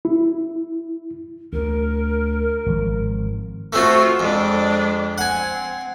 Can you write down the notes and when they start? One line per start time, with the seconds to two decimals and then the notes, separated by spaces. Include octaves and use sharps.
0.05 E4
1.53 D2 A#4
2.66 G#1 F3
3.73 A3 C4 F4 F#4 A4
4.20 F2 G#3 D4
5.18 C4 F#5 G#5